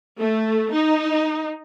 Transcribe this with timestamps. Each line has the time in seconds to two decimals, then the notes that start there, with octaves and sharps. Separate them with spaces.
0.19 A3
0.74 D#4